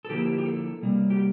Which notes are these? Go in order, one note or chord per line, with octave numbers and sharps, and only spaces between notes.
A4
D3 F3 A#3 E4 G4
G4
A4
C3 G3 A#3
G4